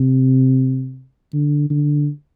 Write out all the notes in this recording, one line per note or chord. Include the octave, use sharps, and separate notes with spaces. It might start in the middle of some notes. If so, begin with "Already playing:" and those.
Already playing: C3
D3
D3